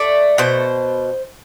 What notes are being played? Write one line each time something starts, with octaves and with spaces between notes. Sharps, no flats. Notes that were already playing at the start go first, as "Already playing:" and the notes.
Already playing: A3 D5
B2 C5